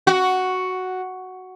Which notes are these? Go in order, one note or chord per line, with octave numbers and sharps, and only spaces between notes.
F#4